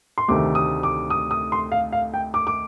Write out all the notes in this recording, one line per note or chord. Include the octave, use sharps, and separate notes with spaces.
C6
D2 C3 D#3 A3 D6
D#6
D6
D#6
D#6
C6
F5
F5
G5
D6
D6